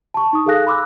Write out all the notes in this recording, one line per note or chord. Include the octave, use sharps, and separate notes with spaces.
A5 C#6
D#4 D#6
G#4 A4 F5 G#5 F#6 A#6
B5 C6 D6 E6 F#6